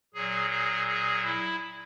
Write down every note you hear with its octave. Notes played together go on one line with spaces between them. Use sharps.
A#2 F#3 G#4
G#4
G#4
E4